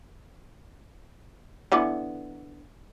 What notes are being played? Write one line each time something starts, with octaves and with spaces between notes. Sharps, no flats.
D3 E3 B3